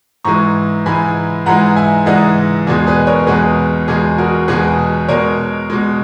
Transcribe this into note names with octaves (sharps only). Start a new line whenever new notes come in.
G#2 E3 G#3 A#5 C#6
G#2 E3 G#3 G#5 B5
G#2 E3 G#3 F#5 A#5
E5 G#5
G#2 E3 G#3 D#5 F#5
E2 B2 G#3 G#4
G#4 B4
A#4 C#5
E2 B2 G#3 G#4 B4
E2 B2 G#3 G#4
F#4 A#4
E2 B2 G#3 G#4 B4
B2 G#3 A#4 C#5
B2 G#3